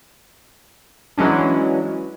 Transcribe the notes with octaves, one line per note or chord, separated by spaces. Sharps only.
E3 F#3 G#3 C#4 D4